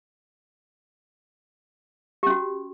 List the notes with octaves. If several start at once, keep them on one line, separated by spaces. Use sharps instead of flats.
C#4 F#4 G4